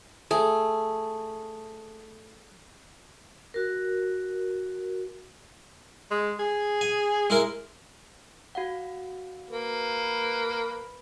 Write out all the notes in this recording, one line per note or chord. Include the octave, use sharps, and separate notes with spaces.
A3 G#4
F#4 A#4
G#3
G#4
G#5
G#3 E4 A#4
F#4 F5 F#5
A#3 B4